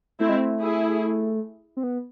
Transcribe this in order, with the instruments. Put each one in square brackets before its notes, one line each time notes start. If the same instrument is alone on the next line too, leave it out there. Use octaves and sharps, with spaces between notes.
[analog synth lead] A3 [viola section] C4 E4
[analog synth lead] G#3
A3
[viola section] E4 G#4
[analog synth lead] C4
B3